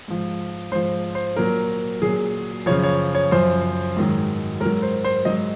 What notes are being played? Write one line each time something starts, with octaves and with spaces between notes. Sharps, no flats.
G#2 F3
G#2 F3 C5
C5
A#2 F#3 A#4
A#2 F#3 G#4
F#2 C#3 F3 C#5
C#5
C#5
F#2 F3 C5
G#2 D#3 F#3
G#2 F#3 A#4
C5
C5
G#2 F#3 D#5